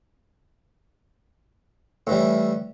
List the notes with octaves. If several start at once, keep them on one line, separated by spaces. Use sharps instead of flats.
A2 E3 G3